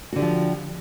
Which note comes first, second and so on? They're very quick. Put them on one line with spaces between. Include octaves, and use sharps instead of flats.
F#4 D3 G4 F3